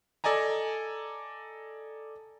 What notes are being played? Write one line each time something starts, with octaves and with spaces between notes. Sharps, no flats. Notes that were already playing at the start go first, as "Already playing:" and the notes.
A4 D5 D#5 G#5 A#5